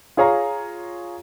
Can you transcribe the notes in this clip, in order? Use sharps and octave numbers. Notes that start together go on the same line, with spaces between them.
F4 G#4 C#5 F5 A#5